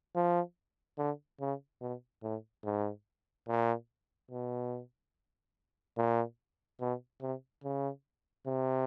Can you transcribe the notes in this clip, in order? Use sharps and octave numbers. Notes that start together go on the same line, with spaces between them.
F3
D3
C#3
B2
A2
G#2
A#2
B2
A#2
B2
C3
C#3
C3